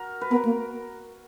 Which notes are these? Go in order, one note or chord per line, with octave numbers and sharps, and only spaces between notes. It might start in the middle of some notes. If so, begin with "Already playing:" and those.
Already playing: F#4 A#4
B4
B3 A#4
A#3